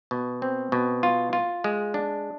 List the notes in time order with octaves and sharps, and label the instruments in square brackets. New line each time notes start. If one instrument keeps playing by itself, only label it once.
[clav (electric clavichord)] B2
C4
B2
F4
F4
G#3
D4